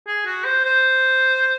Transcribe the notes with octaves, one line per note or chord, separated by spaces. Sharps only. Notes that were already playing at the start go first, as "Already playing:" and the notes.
G#4
F#4
C5
C5